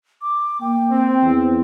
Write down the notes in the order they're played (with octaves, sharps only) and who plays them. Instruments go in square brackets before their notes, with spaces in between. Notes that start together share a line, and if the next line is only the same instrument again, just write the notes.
[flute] D6
[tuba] A#3 [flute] G5
[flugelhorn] C4
[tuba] E2